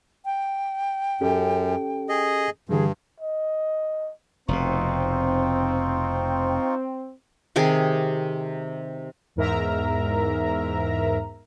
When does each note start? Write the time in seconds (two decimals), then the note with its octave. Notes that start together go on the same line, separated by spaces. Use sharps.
0.25 G5
1.21 F#2 C#4 G4 A4
2.09 G#4 D#5
2.69 G2 D3 E3 G3 G#4
3.20 D#5
4.48 F1 B2 C4 D#4 F4 C#6
7.56 C3 D#3 G4 G#4
9.36 E2 G#2 A#4 E5 A#5